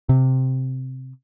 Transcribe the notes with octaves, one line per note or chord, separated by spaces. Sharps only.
C3